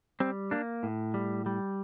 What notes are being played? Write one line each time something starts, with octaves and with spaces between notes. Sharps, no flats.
G3 C4
A#3 D4
A2
G3
G3